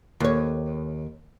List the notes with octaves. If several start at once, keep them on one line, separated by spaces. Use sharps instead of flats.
D#2 C#5